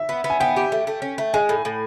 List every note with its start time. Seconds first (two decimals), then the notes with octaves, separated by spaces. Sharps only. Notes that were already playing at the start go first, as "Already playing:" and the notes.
Already playing: E5
0.09 B3
0.24 B3
0.30 G#5
0.40 B3 G5
0.56 G4
0.72 A3
0.87 A3
1.02 C#4
1.18 A3
1.34 G#3 G#5
1.49 A2
1.65 A2